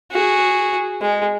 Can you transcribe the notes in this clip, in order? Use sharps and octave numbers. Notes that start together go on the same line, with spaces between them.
F#4 G#4
G#3